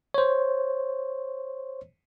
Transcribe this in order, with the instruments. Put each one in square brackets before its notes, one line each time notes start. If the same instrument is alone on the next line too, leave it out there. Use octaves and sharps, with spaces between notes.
[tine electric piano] C5 C#5